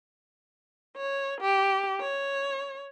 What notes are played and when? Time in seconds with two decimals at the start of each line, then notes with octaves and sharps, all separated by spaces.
0.97 C#5
1.41 G4
2.01 C#5